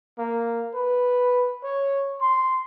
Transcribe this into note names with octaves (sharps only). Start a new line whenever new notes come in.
A#3
B4
C#5
C6